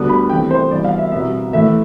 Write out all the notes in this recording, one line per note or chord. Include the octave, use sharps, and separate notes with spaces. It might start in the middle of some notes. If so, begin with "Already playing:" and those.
Already playing: D2 D3 G3 B3 D4
B5
C3 E3 A3 G5
C5
G2 E3 B3 D5
F5
E5
C2 B2 B3 E5
A2 E3 A3 E5